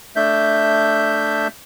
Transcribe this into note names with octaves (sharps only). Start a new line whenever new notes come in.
A3 D4 E5 G6